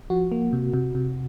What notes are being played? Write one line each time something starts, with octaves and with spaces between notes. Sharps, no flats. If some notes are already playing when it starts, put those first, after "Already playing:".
F3 F#4
A#3
C3
C3
C3